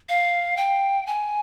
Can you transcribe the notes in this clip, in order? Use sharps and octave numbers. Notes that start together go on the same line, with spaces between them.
F5
G5
G#5